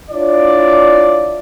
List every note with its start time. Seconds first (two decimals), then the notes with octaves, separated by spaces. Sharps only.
0.11 D4 E4 F4 C#5 D5